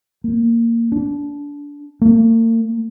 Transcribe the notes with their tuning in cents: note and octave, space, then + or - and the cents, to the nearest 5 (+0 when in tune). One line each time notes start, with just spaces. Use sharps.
A#3 -10
D4 -25
A#3 -45